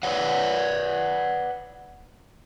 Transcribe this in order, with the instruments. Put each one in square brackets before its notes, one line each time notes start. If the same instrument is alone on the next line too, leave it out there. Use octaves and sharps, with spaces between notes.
[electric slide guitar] B4 C#5 D5 F#5